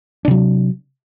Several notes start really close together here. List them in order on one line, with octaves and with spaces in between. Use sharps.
D4 C3 F#3